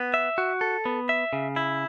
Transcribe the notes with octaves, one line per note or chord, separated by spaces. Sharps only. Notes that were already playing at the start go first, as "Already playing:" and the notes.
Already playing: B3
E5
F#4
A4
B3
E5
C#3
E4